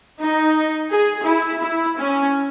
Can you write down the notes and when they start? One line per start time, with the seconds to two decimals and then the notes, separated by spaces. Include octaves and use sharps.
0.19 D#4
0.89 G#4
1.25 E4
1.60 E4
1.96 C#4